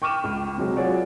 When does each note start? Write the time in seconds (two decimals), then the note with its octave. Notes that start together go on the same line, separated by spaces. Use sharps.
0.02 G5 C#6 D6 F6 D#7 E7
0.24 C#2
0.58 C3 F#3 G#3
0.76 F4 F#4 G#4 C#5 D5 F#5